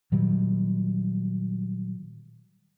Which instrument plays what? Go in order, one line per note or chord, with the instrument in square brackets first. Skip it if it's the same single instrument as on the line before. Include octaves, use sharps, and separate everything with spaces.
[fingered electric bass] A#2 D#3 F#3 G3